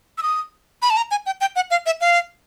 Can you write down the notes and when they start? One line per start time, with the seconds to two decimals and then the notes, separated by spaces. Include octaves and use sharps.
0.18 E6
0.23 D#6
0.82 B5
0.90 A5
0.97 A#5
1.11 G#5
1.26 G5
1.41 G5
1.56 F#5
1.71 F5
1.86 E5
2.01 F5